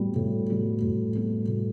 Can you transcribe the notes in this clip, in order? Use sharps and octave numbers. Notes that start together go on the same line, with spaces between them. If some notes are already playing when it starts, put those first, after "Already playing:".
Already playing: A2 G3 B3 F#4
A2
G3 B3 F#4
A2
G3 B3 F#4
A2